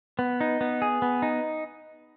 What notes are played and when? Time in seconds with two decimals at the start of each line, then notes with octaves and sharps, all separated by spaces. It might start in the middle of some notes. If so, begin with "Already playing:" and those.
0.19 B3
0.41 D#4
0.61 B3
0.82 G#4
1.02 B3
1.22 D#4